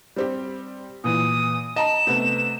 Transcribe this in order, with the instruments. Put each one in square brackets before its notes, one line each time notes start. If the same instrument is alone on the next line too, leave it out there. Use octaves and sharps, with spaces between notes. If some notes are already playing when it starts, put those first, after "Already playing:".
[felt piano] G3 C4 G4
[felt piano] A#2 E3 [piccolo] D#6
[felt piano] D#5 A5 A#5 [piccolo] E7
[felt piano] C3 A3 B3